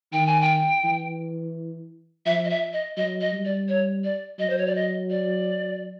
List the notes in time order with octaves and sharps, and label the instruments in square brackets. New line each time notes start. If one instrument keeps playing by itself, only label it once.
[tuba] D#3 [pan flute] G5
[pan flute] G#5
G5
[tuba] E3
[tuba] F3 [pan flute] E5
[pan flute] D#5
E5
D#5
[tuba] F#3 [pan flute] D#5
[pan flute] D#5
[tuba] G3
[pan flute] D5
C#5
D5
[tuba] F#3 [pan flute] D#5
[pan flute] C5
C#5
D5
D#5
D5